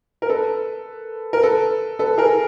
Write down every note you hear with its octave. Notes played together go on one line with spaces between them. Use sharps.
A#4
A4 B4
A#4
A4 B4
A4 B4
G#4 A#4